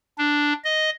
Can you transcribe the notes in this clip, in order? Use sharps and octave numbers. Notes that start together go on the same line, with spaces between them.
D4
D#5